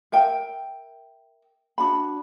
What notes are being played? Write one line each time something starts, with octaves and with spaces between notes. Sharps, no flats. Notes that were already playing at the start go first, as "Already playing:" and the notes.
A#4 E5 G5
D4 F#4 B5